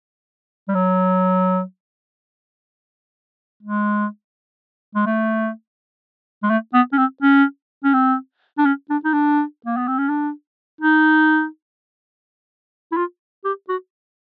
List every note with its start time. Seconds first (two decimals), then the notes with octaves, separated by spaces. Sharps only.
0.68 G3
0.75 F#3
3.63 G#3
4.95 G#3
5.06 A3
6.43 G#3
6.50 A3
6.74 B3
6.93 C#4
6.98 C4
7.22 C#4
7.84 C#4
7.93 C4
8.58 D4
8.65 C#4
8.90 D4
9.04 D#4
9.13 D4
9.66 A#3
9.77 B3
9.87 C4
9.98 C#4
10.09 D4
10.81 D#4
12.92 E4
12.97 F4
13.44 G4
13.69 F#4